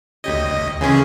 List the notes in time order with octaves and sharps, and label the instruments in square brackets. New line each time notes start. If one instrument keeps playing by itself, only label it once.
[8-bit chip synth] D2 D#5 [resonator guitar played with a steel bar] G4 C#5
[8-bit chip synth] C#3 E3 G#4 [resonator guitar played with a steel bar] G#3 C#4